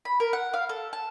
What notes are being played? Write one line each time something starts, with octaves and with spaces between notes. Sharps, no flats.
B5
A#4
F#5
F5
A4
A5